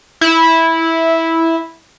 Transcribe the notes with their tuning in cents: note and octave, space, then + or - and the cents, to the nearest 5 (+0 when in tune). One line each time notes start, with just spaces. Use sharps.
E4 -10